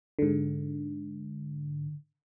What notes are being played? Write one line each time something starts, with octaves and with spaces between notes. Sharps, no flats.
G#2 D3